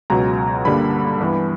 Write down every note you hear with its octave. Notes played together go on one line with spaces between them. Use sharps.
C#2 B2 F#3 A#5
G2 D3 G3 A#3 B5
G2 E3 B3